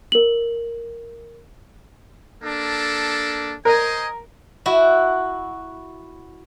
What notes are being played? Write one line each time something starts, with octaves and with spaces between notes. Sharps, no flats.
A#4 F#7
A#3 D4 A4
A#4 C5 D#5 G#5
E4 F#4 E5